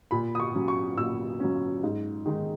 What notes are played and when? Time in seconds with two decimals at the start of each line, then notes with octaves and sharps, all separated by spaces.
0.11 A#2 B5
0.35 D#6
0.40 C#6
0.55 F#3 C#4
0.68 C#6
0.97 A#2 E6
1.40 F#3 C#4
1.83 G#2
2.26 D#3 G#3 D#4